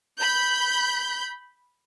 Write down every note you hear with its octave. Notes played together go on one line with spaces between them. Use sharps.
B5 G6